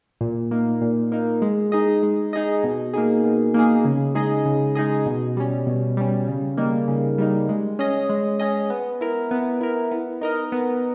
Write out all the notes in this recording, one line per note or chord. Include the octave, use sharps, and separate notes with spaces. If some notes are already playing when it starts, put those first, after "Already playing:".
A#2
A#3 D#4
A#2
A#3 D#4
G#3
D#4 G#4 D#5
G#3
D#4 G#4 D#5
B2
A#3 D#4 G#4
B2
A#3 D#4 G#4
C#3
G#3 D#4 G#4 D#5
C#3
G#3 D#4 G#4 D#5
B2
G3 C#4
B2
G3 C#4
C#3
G3 A#3 D#4
C#3
G3 A#3 D#4
G#3
C#4 G#4 D#5
G#3
C#4 G#4 D#5
B3
E4 A#4
B3
E4 A#4
B3
D#4 A#4 D#5
B3